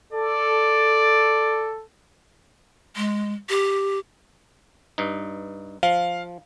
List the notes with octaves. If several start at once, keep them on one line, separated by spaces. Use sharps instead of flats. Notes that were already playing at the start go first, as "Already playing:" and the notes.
A4 D5
G#3
G4
G2 D#4
F3 F5